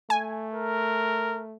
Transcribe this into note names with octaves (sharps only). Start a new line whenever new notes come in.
A3 G#5
A#4